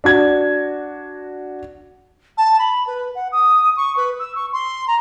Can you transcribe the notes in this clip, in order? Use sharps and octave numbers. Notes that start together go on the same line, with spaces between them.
D4 F#4 G#6
A5
B5
B4
F#5
D#6
C#6
B4
E6
C#6
C6
A#5